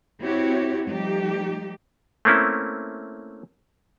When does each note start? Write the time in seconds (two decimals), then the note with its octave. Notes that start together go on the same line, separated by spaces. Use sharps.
0.21 C4 E4 F#4 G4 C#5
0.88 F3 G3 A3 D#4 G4
2.25 A3 A#3 C4 C#4 E4